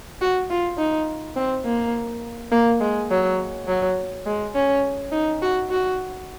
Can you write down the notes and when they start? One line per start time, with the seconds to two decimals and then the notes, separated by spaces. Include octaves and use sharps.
0.21 F#4
0.50 F4
0.78 D#4
1.36 C4
1.65 A#3
2.52 A#3
2.80 G#3
3.11 F#3
3.67 F#3
4.26 G#3
4.55 C#4
5.12 D#4
5.42 F#4
5.71 F#4